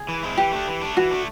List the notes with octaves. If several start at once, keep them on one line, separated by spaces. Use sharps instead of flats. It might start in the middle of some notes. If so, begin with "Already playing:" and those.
Already playing: G#4
E3
G#3 C4 E4
E3 G4
A3 D4
E3
A3 D4
E3 F#4
A3 D4